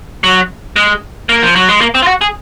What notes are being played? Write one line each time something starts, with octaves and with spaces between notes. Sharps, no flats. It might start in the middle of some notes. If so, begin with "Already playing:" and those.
F#3
G#3
A#3
F3
F#3
G#3
A#3
C4
F4
F#4
G#4